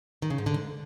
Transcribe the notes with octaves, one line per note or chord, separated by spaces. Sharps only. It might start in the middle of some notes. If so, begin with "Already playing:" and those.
D#3
C#3
G#2
D3
G#2